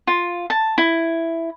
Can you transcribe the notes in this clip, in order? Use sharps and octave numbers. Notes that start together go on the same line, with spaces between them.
F4
A5
E4